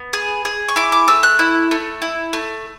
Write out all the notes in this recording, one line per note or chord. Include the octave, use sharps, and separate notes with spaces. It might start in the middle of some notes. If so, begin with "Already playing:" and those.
Already playing: B3
G#4
G#4
C#6
E4 D6
D6
A3 E6
F#6
E4
A3
E4
A3